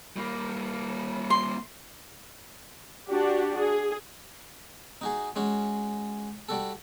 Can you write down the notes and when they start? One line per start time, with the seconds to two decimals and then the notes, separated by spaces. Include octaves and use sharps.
0.16 G3 A#3
1.30 C6
3.08 D4 F#4 G4
3.57 G#4
5.01 D#4 F#4 G#4
5.36 G#3 C#4 F#4
6.49 G3 F#4 A4